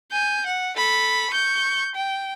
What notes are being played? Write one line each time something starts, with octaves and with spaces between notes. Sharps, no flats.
G#5 G6
F#5
A4 B5
C#6 G6
G5